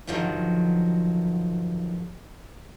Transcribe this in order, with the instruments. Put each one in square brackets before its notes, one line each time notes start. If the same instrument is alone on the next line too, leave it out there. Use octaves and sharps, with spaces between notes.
[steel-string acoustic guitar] G2 D3 D#3 F3 F#3